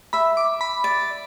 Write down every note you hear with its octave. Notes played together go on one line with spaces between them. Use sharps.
E5 B5
D6
B5
D5